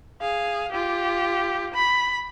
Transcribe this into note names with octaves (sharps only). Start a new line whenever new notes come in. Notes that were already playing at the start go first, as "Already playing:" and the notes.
G#4 F5
F4 G4
B5